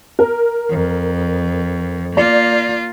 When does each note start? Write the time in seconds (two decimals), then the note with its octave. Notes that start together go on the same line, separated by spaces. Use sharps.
0.19 A#4
0.70 F2
2.17 A#3 F4 D5